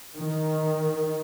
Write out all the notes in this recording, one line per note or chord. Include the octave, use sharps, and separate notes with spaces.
D#3